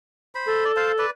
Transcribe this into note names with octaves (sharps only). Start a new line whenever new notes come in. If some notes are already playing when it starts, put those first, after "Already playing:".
C5 B5
A4
D5
C5 F5 A5
B4 D5